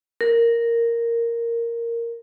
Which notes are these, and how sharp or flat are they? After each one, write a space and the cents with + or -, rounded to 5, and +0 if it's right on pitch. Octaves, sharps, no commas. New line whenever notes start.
A#4 -5